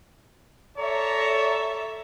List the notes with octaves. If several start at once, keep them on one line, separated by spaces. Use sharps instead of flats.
A4 C#5 D5 E5 A#5